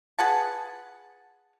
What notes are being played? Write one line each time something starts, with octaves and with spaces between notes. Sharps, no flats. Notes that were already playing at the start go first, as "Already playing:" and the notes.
G#4 B4 F#5 A5